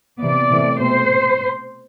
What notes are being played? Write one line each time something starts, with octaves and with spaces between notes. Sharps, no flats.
C3 E3 B3 D5
C3 E3 A3
B2 A3 C4 C5